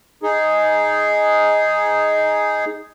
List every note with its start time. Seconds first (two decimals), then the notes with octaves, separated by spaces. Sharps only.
0.23 D#4 G#4